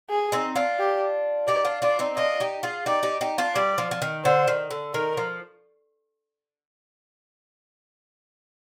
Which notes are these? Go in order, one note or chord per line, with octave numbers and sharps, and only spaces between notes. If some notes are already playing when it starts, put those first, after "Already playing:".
G#4
C4 D#4
D4 F4
G4
D#4 G4 D5
D4 F4
D4 F4 D5
C4 D#4
D4 F4 D#5
D#4 G4
F4 G#4
D#4 G4 D5
D#4 G4
D#4 G4
D4 F4
G3 D5
F3
F3
D#3
D3 C5
D#3
D3
D#3 A#4
F3